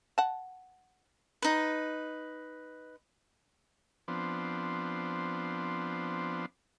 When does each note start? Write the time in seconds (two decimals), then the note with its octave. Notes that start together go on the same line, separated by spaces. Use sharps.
0.18 F#5 A5
1.42 D#4 B4
4.08 F3 B3 C4 D4